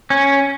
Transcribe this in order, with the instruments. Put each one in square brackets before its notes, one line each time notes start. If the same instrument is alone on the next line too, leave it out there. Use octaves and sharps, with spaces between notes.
[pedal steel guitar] C#4